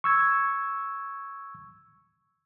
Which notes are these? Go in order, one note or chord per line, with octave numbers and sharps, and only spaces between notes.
C#6 E6 G#6